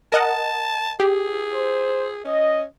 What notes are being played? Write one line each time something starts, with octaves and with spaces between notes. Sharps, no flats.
A#4 D#5 F#5 A5
G4 G#4
C5
C#4 D#5